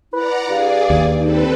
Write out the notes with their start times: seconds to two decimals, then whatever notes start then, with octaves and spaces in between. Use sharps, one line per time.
0.13 E4 B4 D5 F#5 A#5
0.49 G2 G#4 D5 F5
0.90 D#2
1.19 C4 D#4 A4 B4